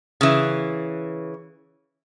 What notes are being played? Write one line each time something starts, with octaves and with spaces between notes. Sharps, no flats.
C#3 E3